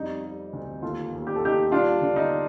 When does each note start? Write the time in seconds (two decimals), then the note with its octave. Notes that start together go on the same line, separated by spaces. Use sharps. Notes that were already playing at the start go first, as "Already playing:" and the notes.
Already playing: F2 G3 D#4
0.23 G3
0.53 D2
0.82 D#2 F4 A4
1.12 D#2
1.27 G4
1.36 A4
1.42 D#2 D#4 G4
1.72 G3 D4 F4
2.02 D3
2.16 D#4